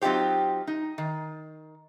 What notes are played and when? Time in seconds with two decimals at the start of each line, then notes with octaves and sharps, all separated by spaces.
0.01 F#3 C4 D#4 F4 G4 C5
0.67 D#4
0.98 D#3